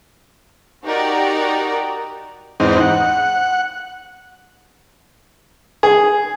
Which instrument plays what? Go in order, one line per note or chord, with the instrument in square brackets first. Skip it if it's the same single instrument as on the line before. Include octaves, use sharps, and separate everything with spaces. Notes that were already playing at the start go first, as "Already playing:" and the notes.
[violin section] D#4 F#4 G4 A#4 D5
[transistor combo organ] E2 G#2 C4 D#4
F#5
[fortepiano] G#4